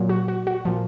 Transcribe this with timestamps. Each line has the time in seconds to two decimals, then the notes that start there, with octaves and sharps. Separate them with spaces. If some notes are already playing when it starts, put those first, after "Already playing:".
Already playing: A#2 F#3
0.09 F#4
0.28 F#4
0.47 F#4
0.65 A#2 F3